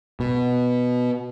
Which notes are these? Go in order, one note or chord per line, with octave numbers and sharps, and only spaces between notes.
B2